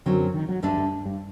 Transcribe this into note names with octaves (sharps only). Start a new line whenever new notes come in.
F#2 D3 F#3 C4
D#3
F#3
D2 G2 D3 A3 D4
G2
G2